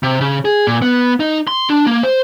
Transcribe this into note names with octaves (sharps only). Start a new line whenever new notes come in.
C3
C#3
G#4
A#2
B3
D#4
C6
D4
A#3
C5